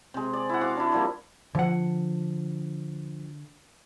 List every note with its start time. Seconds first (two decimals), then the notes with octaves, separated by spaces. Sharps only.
0.14 C3 G#3
0.33 D5
0.49 E4 F#5
0.61 F#4 F5 D6
0.77 D4 E4
0.92 F3 G3 A#3
1.55 D3 F3 F#5